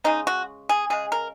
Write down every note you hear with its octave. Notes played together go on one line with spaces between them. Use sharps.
C#3 G#3 D#4
F#4
G#4
C#3 G#3 G#4
A#4